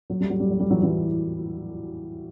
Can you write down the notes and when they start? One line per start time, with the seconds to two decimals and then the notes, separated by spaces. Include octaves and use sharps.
0.10 F#3
0.21 G3
0.30 F#3
0.40 G3
0.51 F#3
0.60 G3
0.70 E3 F#3
0.83 E3 F#3